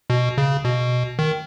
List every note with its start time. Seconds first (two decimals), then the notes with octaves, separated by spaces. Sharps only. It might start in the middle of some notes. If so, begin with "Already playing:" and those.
0.10 B2
0.38 C#3
0.65 B2
1.19 D#3